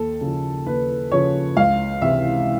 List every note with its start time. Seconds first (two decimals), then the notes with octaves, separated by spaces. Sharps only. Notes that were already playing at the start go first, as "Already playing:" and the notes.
Already playing: D#2 A4
0.21 C#3 F3
0.66 D#2 B4
1.11 C#3 F3 C#5
1.57 C#2 F5
2.02 C3 E3 E5